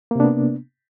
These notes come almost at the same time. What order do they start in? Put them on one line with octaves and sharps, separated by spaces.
A#3 C3 D4 B3